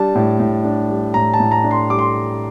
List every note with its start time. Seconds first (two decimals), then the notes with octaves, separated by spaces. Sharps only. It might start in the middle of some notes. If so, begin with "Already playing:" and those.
Already playing: G3 D4 A5
0.15 A2
0.40 A2
0.64 D4
0.90 G3
1.14 A2 A#5
1.34 A5
1.40 A2
1.51 A#5
1.64 D4
1.71 C6
1.90 G3 D6
1.99 C6